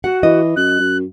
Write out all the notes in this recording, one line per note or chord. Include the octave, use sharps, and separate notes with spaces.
F#4 F#5
E3 D#5
F#2 F#6
F#2